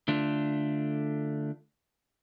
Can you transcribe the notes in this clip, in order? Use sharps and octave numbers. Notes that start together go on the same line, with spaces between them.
D3 A3 D4 F4